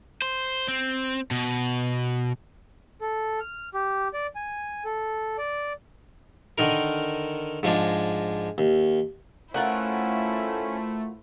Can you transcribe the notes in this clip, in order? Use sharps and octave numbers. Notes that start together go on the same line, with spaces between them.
C5
C4
B2
A4
F6
G4
D5
G#5
A4
D5
D3 D#3 D#4 A#4
G#2 F3 G#3 D4
D#2
A3 C#4 E4 F4 A#4 C5 F#5